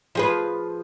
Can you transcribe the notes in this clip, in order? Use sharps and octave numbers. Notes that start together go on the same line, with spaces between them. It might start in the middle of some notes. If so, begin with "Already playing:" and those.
F3 G#4 B4